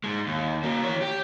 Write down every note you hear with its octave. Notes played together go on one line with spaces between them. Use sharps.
G#2 G#3
D#2
A#3 F#4
E3 C#5
G4